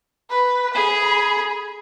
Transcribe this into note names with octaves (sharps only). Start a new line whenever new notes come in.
B4
G#4 B5